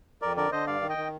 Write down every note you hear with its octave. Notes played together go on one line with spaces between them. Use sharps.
F2 A#4 D5
D3 A#4 D5
D3 C5 D#5
G2 D5 F5
D#3
D#5 G5
D#3